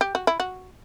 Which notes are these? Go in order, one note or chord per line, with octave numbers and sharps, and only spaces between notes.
G4
F#4
E4
F#4